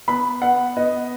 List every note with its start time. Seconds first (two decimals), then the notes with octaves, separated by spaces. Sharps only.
0.08 B3 B5
0.42 B3 F#5
0.76 B3 D#5